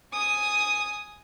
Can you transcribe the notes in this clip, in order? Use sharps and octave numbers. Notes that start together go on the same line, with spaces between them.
G#5 D#6